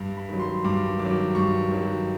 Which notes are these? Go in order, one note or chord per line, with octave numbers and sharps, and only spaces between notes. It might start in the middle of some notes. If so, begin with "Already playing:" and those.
Already playing: G2
B5
D#3 F#3
C6
G2 D6
D#3 D6
F#3
G2 C#6
D#3 F#3